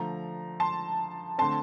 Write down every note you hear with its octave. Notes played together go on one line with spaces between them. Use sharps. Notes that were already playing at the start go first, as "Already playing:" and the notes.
Already playing: D3 F3 A3 A#5
A5 C6
D3 A3 C4 A5 C6